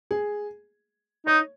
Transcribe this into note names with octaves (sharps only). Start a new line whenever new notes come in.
G#4
D#4 C#5